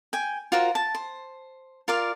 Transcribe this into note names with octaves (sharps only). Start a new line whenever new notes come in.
G5 G#5
F4 F#4 A#4 C5
A5
C5
F4 A#4 D5 F5